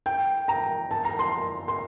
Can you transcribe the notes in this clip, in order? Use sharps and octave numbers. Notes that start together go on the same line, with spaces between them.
G5
A#5
A5
A#5
C6
C6